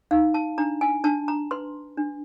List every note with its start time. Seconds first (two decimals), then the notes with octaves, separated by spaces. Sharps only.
0.11 D#4 F5
0.34 A5
0.58 D4 A#5
0.81 G#5
1.04 D4 A5
1.28 A#5
1.51 B4 C6
1.97 D4